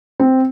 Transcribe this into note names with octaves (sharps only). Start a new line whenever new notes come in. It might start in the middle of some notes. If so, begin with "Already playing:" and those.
C4